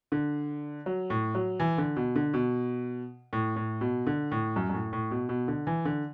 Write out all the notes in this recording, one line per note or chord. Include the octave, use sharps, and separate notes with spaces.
D3
F#3
A2
F#3
E3
D3
B2
D3
B2
A2
A2
B2
D3
A2
F#2
F#2
A2
A2
B2
B2
D3
E3
D3